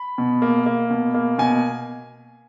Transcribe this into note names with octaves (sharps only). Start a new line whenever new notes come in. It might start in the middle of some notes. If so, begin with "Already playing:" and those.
Already playing: B5
B2
A#3
A#3
B2
A#3
B2 G#5